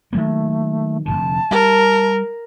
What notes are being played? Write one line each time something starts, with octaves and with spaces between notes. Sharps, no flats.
D#3 F#3 A3 A#3
F1 B1 D3 A5
G3 A#4